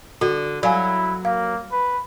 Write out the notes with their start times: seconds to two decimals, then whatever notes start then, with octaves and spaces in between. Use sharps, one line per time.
0.21 D3 F#4
0.63 F#3 E4 D5 F5 G#5
1.25 A#3 F5
1.72 B4